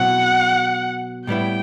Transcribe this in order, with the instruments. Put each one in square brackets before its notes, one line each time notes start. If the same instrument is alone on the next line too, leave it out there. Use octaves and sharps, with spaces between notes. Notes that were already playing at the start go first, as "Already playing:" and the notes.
Already playing: [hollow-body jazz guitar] B2 F#3 C4 E4 [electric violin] F#5
[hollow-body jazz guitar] A2 G3 B3 E4 [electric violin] G5